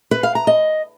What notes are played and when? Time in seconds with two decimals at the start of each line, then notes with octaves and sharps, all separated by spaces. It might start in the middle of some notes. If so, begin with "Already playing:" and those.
0.11 B4
0.23 F5
0.35 A#5
0.47 D#5